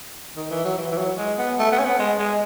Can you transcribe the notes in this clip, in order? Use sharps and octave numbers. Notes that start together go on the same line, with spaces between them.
D#3
E3
F#3
E3
E3
F#3
G#3
B3
A3
B3
C#4
B3
G#3
G#3